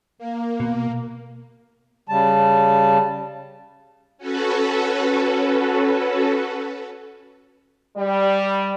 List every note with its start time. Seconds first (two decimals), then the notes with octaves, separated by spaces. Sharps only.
0.18 A#3
0.60 B2
2.09 C#3 G3 A5
4.18 C#4 F#4 A4 B4
7.97 G3